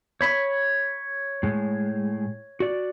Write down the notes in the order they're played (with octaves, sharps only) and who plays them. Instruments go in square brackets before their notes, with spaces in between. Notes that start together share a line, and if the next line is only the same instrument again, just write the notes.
[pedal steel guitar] C#5 B5
[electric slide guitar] A2 G#3
F#4 D5